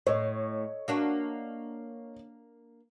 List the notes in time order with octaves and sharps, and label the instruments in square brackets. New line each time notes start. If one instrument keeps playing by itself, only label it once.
[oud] A2 [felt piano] C#5 D#5
[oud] A#3 D4 F#4